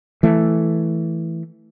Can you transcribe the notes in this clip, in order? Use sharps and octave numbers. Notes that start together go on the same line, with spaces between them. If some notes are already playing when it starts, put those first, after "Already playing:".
E3 A3